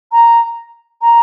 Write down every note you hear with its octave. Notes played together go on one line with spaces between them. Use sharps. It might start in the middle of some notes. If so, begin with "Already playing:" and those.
A#5
A#5